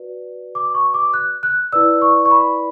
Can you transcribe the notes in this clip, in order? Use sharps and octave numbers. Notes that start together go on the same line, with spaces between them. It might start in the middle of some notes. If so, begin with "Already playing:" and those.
Already playing: F#4 B4 D5
D6
C#6
D6
F#6
F#6
E4 B4 D5 E6
C#6
C#6
B5